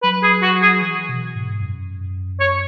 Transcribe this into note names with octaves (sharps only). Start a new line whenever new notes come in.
F#3 B4
G#4
F#4
G#4
E3
B2
G#2
F#2
C#5